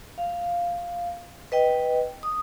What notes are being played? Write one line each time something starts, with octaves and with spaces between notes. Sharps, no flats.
F5
B4 D#5 G5
D#6